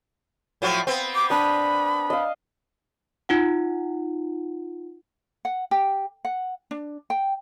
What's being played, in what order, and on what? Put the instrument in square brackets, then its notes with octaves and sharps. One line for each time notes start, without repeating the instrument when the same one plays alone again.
[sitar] A2 F3 F#3
B3 C4
[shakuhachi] D6
[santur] D4 D#6 [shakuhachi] B5
[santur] D#5 F5
[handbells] D#4 F4 F#5
[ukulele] F#5
G4
F#5
D4
G5